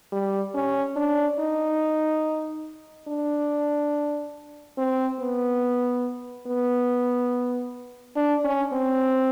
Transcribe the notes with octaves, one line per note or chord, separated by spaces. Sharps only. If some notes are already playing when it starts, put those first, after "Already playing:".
G3
C#4
D4
D#4
D4
C4
B3
B3
D4
C#4
C4